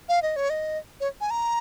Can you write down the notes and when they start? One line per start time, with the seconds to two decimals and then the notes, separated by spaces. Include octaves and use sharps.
0.09 F5
0.22 D#5
0.36 C#5
0.50 D#5
1.00 C#5
1.21 G#5
1.30 A#5